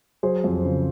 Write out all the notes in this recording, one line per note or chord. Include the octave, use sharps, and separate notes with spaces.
F#3 G#4 C5
F2
C#3